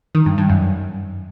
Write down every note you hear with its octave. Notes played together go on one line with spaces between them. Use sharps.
D#3
G2
G2
F#2